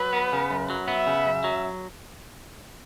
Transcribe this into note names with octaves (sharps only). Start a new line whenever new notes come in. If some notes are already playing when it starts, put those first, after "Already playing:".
Already playing: F#3 B4
B3
C#3
F#2
F#3
B3 E5
C#3
F#2
F#3